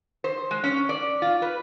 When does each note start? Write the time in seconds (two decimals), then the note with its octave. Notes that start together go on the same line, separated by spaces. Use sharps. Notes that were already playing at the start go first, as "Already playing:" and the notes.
0.24 C5
0.51 G#3
0.64 C#4
0.89 D5
1.22 F4
1.42 B4